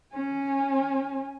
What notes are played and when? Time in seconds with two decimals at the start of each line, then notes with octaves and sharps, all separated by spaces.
0.14 C#4 G#5